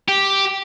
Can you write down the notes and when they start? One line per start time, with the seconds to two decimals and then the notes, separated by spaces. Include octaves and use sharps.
0.08 G4